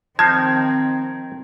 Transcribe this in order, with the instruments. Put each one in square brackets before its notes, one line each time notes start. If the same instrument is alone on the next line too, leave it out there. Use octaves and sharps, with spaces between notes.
[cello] D#3 C4 [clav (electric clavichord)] F3 D#4 C5 [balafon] A5 [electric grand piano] G#6